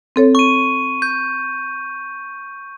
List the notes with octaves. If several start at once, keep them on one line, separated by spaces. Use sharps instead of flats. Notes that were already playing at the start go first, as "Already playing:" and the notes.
C4 A4 C#5
C#6 D#7
G6